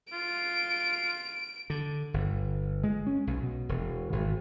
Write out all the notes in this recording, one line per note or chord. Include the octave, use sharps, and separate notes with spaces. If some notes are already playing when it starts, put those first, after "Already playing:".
F4 D7
D3
G1
G#3
C#4
B1
B2
E1
G#1